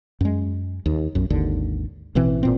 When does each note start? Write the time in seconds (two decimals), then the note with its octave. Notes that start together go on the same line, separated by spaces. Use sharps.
0.21 F#2 G#3
0.86 D#2
1.15 B1 F#2
1.30 G#1 D#2 D3
2.15 A1 B2 E3 C4
2.43 G#1 A#2 C4